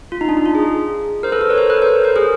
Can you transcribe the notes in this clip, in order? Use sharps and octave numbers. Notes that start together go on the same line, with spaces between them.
F4
D#4
D4
D#4
F4
G#4
A#4 C5
A4 B4
A#4 C5
B4 C#5
A#4 C5
A4 B4
A#4 C5
A#4 C5
G#4 A#4